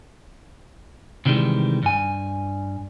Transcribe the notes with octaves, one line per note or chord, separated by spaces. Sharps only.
C3 D#3 E3 G3 G#3
G2 G#5